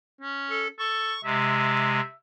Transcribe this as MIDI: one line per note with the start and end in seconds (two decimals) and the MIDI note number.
0.21 0.66 61
0.50 0.68 69
0.79 1.13 69
0.79 1.21 85
1.24 2.00 48
1.24 2.00 56
1.24 2.14 76